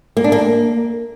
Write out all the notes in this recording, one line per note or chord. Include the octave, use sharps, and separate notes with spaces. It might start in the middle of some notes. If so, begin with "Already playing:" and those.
A#3
D4
A#3